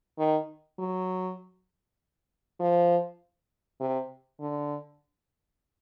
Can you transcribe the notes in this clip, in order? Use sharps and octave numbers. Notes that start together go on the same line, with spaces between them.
D#3
F#3
F3
C3
D3